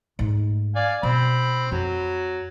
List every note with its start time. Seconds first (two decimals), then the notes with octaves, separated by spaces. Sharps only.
0.19 G#2 A3
0.75 D5 F5 G#5
1.03 B2 C4 B5
1.72 F2 F#3